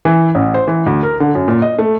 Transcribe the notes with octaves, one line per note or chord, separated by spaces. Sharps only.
E3
A1
C5
E3
D2
A#4
D3
F#2
A#2
D#5
A3